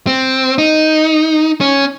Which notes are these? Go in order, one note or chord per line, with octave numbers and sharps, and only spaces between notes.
C4
D#4
C#4